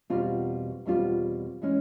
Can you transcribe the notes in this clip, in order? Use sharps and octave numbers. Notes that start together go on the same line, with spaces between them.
E2 B2 G3 C4 F4
E2 B2 G3 C4 F4
E3 G#3 C#4